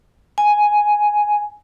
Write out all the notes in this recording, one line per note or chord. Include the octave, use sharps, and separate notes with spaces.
G#5